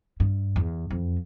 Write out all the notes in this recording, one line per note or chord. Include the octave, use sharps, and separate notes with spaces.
G2
E2
F2